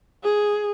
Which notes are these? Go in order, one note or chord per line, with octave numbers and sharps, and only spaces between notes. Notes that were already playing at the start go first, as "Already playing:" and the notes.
G#4